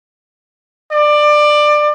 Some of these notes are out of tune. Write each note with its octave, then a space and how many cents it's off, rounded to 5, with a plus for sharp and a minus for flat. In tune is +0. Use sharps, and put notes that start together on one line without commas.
D5 +20